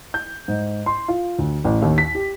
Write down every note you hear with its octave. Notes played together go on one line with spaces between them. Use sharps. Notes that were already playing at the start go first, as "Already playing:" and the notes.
G6
G#2
C6
F4
D2
A1
D#2
B6
G4